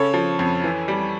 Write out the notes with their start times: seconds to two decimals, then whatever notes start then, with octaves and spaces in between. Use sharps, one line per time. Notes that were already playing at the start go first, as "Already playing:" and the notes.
Already playing: C#3 A4 C#5
0.14 F3
0.39 F2
0.64 E3
0.88 G3